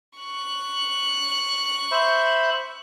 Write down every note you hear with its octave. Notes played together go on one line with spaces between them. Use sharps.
C#6 F#6
C5 E5 B5